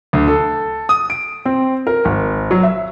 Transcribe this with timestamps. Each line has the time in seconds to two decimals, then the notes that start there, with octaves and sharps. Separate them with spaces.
0.13 D2
0.28 A4
0.89 D#6
1.10 D7
1.46 C4
1.87 A#4
2.05 G#1
2.51 F#3
2.63 E5